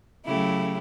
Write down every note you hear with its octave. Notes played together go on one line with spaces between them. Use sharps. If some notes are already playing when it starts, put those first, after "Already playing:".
C#3 F#3 A3 E4 G4